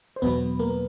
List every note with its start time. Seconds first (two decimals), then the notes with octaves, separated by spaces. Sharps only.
0.16 C5
0.22 E2 B2 F#3 B3 B4
0.59 A#3 A#4